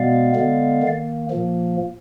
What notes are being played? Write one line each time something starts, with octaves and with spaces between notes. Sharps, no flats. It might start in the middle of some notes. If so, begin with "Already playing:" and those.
Already playing: B2 G#3 B3 D5 F5
D3 G#3 B3
D#3 A#3
A#2 F3 A#3